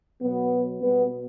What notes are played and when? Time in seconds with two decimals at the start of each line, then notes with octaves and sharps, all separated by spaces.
0.20 B2 F#3 B3
0.81 B2 G3 B3